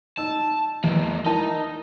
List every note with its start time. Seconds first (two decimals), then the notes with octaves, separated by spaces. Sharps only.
0.17 D#4 A5 E6
0.84 E2 G#3 A#3
1.26 D#4 E4 A#4 A5